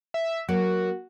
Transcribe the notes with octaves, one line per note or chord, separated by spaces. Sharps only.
E5
F#3 A#3 F#4